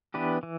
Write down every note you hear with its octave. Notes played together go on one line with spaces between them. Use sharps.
E3 B3 D4 G4 B4
E3